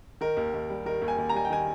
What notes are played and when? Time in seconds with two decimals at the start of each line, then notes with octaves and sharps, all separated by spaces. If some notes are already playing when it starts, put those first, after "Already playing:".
0.21 D#3 A#4
0.37 D#2
0.54 D#2
0.70 G3
0.86 D#3 A#4
1.02 D#2
1.08 G#5
1.18 D#2
1.29 A#5
1.34 G3 G#5
1.45 G5
1.50 D#3 G#5